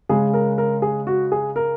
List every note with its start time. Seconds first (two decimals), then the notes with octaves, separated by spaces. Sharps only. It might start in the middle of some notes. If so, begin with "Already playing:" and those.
0.09 C#3 G#3 G#4
0.34 A#4
0.58 A#4
0.82 G#4
1.07 F#4
1.32 G#4
1.56 A#4